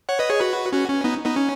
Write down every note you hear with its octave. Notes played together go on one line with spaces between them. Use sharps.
C#5 F#5
B4 D#5
G#4 C#5
F#4 B4
C#4 F#4
C#4
B3 D#4
B3 D#4
C#4